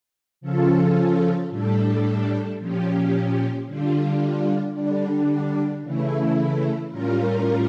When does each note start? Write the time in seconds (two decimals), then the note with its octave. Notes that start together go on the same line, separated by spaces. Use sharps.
0.41 C#3 F3 C#4 F4 A4
1.49 A2 G3 D4 A4
2.57 A#2 F3 C#4 G4
3.67 D3 G3 D4 F4
4.74 D3 G3 D4
5.82 C#3 E3 A3 E4
6.90 A2 G3 C#4 F4 A#4